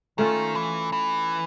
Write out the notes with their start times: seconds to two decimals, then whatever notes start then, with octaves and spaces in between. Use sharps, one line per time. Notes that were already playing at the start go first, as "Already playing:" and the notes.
0.18 D#3 A3 C#4 F4 A4
0.55 E3
0.92 E3